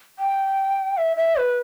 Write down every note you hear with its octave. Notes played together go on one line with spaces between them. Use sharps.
G5
E5
E5
B4